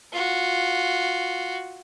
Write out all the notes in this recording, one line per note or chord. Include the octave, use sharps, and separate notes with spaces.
F4 F#4